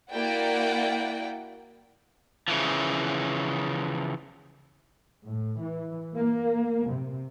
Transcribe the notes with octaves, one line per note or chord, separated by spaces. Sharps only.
A#3 E4 F#4 D5 F#5 G5
C#3 E3 F3
A2
E3
A#3
C3